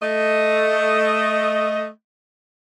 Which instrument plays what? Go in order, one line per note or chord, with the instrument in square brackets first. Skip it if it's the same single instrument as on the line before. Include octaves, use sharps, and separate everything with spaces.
[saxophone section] A3 D#5